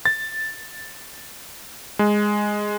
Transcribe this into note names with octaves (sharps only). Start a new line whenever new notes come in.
A6
G#3